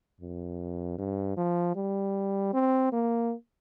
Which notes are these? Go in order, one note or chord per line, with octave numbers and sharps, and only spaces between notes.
F2
G2
F3
G3
C4
A#3